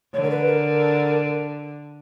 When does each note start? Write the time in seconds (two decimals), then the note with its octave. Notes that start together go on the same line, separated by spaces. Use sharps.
0.14 D3 C#5
0.23 A#4
0.30 B4
0.47 A#4